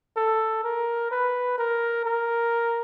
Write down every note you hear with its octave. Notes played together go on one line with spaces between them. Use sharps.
A4
A#4
B4
A#4
A#4